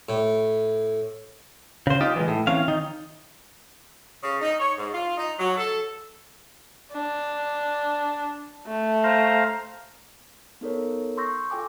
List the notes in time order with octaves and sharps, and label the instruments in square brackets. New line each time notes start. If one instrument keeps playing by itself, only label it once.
[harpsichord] A2
[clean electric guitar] C#3 C5
D#4 F4 G4
E3 F#3 G#3
A2
E3 C4 C#4 F5
D#3 D#4
[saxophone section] C#3
D#4
C#5
G#2
F4
D#4
F#3
A4
[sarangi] D4
A3
[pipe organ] C5 F5 A#5
[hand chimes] B3 D#4 A4 A#4 C#5
C6 C#6 E6 G6 A#6
F4 A4 G5 G#5 D6